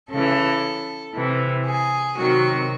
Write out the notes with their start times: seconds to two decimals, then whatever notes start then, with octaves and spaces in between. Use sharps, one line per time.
0.11 C#3 E3 A4
1.15 C3 E3
1.66 G#4
2.17 C3 D#3 F#3 F#4